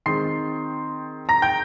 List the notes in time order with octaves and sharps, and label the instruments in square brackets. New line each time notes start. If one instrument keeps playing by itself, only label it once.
[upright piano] D#3 G#3 C4 C6 C7
A#5 A#6
G5 G6